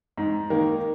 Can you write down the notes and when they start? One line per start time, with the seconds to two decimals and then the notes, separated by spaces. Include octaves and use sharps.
0.18 G#2
0.50 D#3 A#3